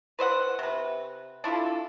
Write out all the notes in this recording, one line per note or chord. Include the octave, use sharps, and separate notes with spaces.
B4 C5 D#5 F#5
C3 B4
D4 E4 F4 A4